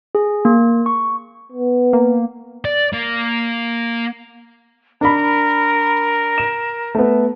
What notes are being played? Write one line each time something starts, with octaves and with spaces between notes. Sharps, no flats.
G#4
A#3
C#6
B3
A#3
D5
A#3
D4 A#4 B5
E7
A3 B3